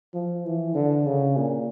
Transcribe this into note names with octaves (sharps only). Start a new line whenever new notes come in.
F3
E3
D3
C#3
A#2